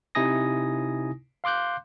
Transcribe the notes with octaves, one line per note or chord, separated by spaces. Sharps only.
C3 D#4 E4 G#5 D#6 A#6
F5 C6 D6 F#6 G6